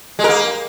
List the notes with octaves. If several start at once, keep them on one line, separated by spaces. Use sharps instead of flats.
G#3
A#4
A#3